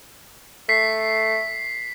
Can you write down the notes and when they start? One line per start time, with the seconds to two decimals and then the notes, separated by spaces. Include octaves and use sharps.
0.69 A3 B6 C7